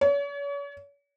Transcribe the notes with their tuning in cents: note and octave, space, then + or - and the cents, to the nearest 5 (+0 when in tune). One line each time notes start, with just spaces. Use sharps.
C#5 +40